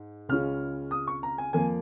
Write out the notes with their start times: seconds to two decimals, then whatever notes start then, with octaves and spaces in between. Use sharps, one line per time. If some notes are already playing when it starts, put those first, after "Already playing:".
Already playing: G#2
0.29 C#2 C#3 G#3 C#4 F4 F6
0.91 D#6
1.07 C#6
1.23 A#5
1.38 G#5
1.53 F2 F3 A#3 G#5